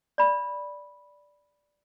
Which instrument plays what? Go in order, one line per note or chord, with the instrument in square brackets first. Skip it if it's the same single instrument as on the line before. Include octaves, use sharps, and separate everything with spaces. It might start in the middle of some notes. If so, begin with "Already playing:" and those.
[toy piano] D5 B5